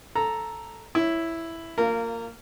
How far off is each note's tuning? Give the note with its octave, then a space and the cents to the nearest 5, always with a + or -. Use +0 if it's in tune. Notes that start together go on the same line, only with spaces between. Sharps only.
A4 +0 A#5 +0
E4 +0 C#5 +0
A#3 -20 F4 +0 A#4 -20